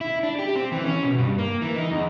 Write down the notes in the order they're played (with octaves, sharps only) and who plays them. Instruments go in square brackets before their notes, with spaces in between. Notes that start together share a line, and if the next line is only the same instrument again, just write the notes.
[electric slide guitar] E4
D4
G4
C4
E3
C#4
B2
G2
A#3
E3
D#4
E2